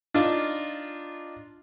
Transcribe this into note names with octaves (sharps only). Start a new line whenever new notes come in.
D4 D#4 F4